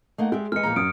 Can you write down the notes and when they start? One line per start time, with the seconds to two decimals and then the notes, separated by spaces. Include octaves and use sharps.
0.18 A3 A#3 D#4 D#5 F#5
0.32 G#3 G4 D5 E5
0.52 E2 G#3 B4 D#5 F6 C#7
0.63 E2 A#2 F3 A#5
0.76 F#2 D#6 F6 D7